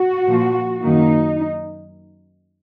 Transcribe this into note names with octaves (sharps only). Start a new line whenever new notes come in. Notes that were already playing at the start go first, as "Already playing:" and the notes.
Already playing: F#4
A#2 F3 A#3
F#2 D#3 A#3 D#4